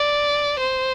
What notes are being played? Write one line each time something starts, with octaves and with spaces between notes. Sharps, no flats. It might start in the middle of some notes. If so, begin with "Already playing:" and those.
Already playing: D5
C5